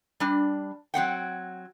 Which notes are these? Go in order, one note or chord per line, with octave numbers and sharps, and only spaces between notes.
G3 D4
F#3 C4 F#5 G5